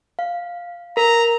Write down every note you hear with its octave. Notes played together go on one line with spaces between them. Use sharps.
F5
A#4 A#5